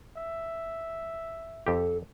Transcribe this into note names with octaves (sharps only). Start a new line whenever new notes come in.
E5
F2 G4 A4